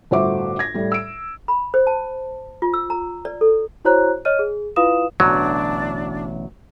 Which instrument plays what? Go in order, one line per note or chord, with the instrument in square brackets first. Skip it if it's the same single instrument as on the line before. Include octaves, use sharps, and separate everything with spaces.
[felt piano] G1 A2 F#4 C5 E5 D6
G#6 A#6
A2 G3
E6 D7
[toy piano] B5
C5
A5
F4
E6
A#5
D5
A4
[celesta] E4 F#4 C5 C#5 A#5 F#6
C#5 D#5 F6 D#7
G#4
E4 F4 B4 F5 D#6 E7
[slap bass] A1 B2 D3 [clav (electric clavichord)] F#3 [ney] D4